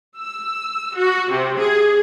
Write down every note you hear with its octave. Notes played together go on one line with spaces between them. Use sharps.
E6
F#4
C3
G#4